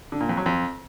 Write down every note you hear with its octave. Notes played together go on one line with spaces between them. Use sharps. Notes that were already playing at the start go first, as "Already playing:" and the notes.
D3
A#2
F2
F#3
F2